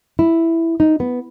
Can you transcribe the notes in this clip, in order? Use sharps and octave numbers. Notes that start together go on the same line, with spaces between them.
E4
D#4
B3